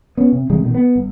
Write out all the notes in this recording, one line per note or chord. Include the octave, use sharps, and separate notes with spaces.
B3 C#4
C3
C3 E3 G3 G#3
A1 B2 D#3
B3
G1